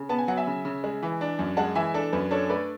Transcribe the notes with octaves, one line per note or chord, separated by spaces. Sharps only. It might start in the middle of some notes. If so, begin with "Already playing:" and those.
Already playing: C#3
B3 A5
G#5
F#3 F#5
E5 G#5
C#3
C#3
G#3
E3
D4
F#2
G#3 F#5 A5
E3 E5 G#5
D4 A4
F#2 B4
D4 A4 C#5
A3 B4 D5